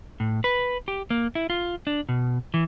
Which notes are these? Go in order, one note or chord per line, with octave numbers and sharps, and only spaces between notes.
A2
B4
G4
A#3
E4
F4
D4
B2
E3